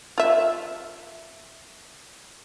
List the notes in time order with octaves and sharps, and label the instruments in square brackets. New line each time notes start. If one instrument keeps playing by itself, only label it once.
[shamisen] F4 E5